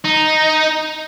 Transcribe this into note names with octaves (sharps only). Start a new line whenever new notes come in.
D#4